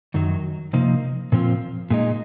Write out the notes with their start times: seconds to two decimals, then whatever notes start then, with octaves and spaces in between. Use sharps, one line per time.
0.14 F#2 D#3 F#3
0.73 C3 F3 A#3 D#4
1.32 A#2 F3 C4 F4
1.90 A#2 G#3 D#4